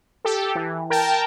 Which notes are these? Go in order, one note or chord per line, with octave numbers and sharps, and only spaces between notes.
G4 A4
E3
A#4 G5 A5